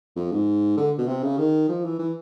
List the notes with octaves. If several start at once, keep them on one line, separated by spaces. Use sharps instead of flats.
F2
G#2
D3
B2
C3
C#3
D#3
F3
E3
E3